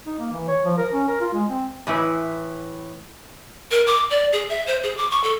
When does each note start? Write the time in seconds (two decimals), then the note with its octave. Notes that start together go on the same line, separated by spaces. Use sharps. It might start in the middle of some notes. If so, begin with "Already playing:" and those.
0.06 D#4
0.19 A#3
0.32 E3
0.48 C#5
0.65 F3
0.78 A#4
0.92 C#4
1.08 A#4
1.21 F4
1.33 G#3
1.48 C4
1.87 A2 E3 E4 B4
3.71 A#4
3.87 D6
4.10 D5
4.33 G#4
4.49 E5
4.67 C5
4.83 G#4
4.97 D6
5.11 C#6
5.24 A4